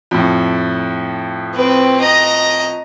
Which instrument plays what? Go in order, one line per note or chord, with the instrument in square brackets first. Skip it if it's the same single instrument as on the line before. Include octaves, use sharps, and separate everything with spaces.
[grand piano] F2 A2
[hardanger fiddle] C4 B4
D#5 A#5